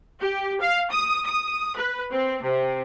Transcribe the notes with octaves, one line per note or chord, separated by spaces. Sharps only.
G4
F5
D#6
D#6
B4
C4
C3